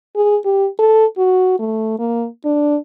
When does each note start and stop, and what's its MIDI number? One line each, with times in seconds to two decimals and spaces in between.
0.16 0.37 68
0.45 0.67 67
0.79 1.05 69
1.18 1.59 66
1.59 1.97 57
1.99 2.27 58
2.45 2.77 62